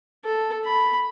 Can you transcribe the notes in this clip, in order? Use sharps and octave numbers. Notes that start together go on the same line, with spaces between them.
A4
B5